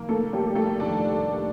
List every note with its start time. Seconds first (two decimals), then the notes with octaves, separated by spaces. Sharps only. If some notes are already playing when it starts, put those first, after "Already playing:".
Already playing: F1 F2 D#3 A#3 A#4
0.09 A3 A4
0.33 G3 G4
0.55 A3 A4
0.80 F1 F2 D#3 D4 D5